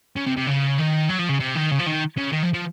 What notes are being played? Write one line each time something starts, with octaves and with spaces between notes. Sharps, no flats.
C#3
C3
C3
C#3
D#3
F#3
F3
C#3
C3
D#3
C#3
F3
D#3
C#3
D#3
F3
F3